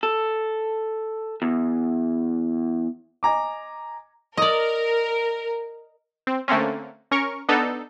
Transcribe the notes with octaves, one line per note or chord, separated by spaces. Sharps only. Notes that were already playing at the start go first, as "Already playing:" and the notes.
A4
E2
D#5 G#5 A#5 D6
A#4 D5 D#5
C4
D3 A3 A#3 C4 C#4
C#4 A#4 C#6
B3 D4 D#4 A4